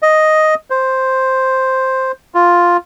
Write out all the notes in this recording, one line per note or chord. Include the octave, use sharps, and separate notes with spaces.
D#5
C5
F4